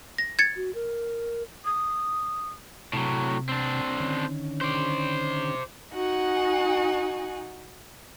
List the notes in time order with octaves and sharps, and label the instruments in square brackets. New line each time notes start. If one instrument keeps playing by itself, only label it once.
[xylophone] A#6
G#6 A6 C#7
[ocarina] F#4
A#4
[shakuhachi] D#6
[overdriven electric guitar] A2 F#3 [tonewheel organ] C3
[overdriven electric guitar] C4 D4
[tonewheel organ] D3 D#3 C#4
[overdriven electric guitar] C5 D5
[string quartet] D#4 F#4 F#5 G#5